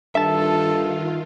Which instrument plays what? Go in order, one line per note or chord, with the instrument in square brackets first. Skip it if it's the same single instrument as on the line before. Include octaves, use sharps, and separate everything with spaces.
[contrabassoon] G2 [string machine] D#3 F4 [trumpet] A4 [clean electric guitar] E5 A5